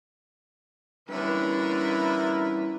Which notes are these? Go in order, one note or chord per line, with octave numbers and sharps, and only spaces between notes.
G2 D3 E3 C#4 E4 A#4 B4